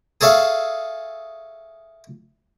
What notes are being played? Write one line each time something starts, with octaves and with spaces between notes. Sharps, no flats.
G#4 A4 C#5 E5 F5